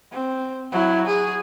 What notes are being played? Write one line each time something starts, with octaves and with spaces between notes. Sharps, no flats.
C4
F#3 E4
G#4